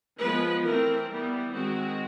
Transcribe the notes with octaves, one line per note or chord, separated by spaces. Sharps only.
F3 G#3 B3 B4
E3 A3 C4 A#4
E3 G3 B3
D#3 G#3 C4 F#4